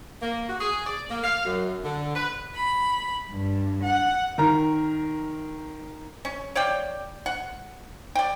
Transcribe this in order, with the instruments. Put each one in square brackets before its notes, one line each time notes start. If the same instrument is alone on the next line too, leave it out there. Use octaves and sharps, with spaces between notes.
[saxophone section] A#3
F#4
G#4
D5
A#3
F5
F#2
D3
B4
[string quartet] B5
G2
F#5
[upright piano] D#3 A#4 A#5
[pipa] C#4
C#5 D5 F5 G5
F#5
D5 G5